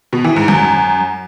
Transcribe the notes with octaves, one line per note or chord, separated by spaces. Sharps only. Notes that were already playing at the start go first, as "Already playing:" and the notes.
B2
E3
G#2
F#2